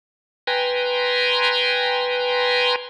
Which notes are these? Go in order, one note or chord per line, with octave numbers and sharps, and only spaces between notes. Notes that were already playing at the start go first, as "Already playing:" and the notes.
B4 G5 G#5 A#5 C6